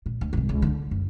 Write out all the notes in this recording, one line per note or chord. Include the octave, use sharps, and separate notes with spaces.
A#2
D2
C2 G#2
C#2
D3 D4
F#1